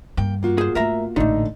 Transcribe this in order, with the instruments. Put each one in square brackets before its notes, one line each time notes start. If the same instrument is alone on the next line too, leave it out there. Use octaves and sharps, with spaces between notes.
[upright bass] G2 [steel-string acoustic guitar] A#3 G5
[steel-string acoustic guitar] A#3 F4 F#4
[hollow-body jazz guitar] G#4 C5
[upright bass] G#2 A3 [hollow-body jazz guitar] A#4 E5 A#5
[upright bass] A1 A#2 [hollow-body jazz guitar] D3 A3 [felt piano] D#4